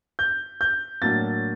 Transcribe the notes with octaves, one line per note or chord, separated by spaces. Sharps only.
G6
G6
A2 F#3 A#3 D4 A6